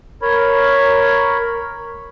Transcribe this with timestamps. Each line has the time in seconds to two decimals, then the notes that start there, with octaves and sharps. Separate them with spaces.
0.22 A#4 C#5 B5